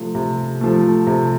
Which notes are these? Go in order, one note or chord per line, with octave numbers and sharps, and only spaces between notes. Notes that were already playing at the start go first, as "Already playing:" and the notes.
Already playing: C3 F3 A3
C3
F3 A3
C3